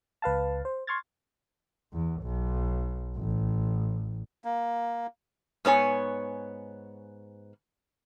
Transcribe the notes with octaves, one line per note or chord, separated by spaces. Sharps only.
C#2 B4 F5 A5
C5
C6 C#6 F6 G#6 A6
E2
B1
A1
A#3
G#2 B3 C#5 G#5